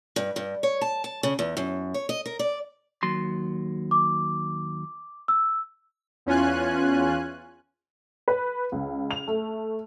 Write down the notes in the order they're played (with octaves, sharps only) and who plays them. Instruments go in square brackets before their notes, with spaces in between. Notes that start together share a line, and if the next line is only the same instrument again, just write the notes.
[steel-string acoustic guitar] G2
G2
C#5
A5
A5
C#3
E2
F#2
C#5
D#5
A#4
D5
[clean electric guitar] D#2 F#3 C6
[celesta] D6
E6
[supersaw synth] E2 C#4 F4 G#5 F#6
[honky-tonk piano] B4
C#2
F7
A3